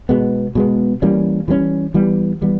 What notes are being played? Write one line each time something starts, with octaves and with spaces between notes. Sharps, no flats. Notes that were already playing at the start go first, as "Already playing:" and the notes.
B2 G#3 B3
B2 G#3 B3
E3 G3 A#3 C#4
E3 G3 A#3 C#4
E3 G3 B3
E3 G3 B3